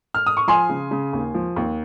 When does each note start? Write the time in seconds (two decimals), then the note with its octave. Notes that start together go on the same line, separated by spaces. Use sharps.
0.14 F6
0.26 D#6
0.37 C#6
0.47 F3 G#5 C6
0.69 C#3
0.91 C#3
1.13 D#2
1.34 F3
1.56 D#2